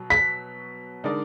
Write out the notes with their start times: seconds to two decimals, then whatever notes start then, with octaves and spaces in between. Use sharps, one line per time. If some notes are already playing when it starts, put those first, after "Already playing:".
Already playing: B2 F#3
0.10 B6
1.04 D3 G#3 D#4 A#4 D5